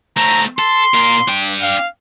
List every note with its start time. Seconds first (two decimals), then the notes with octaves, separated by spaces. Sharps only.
0.17 A3 C4 A#5
0.59 A4 C6
0.94 A#2 A#4
1.28 D4 G5
1.62 F5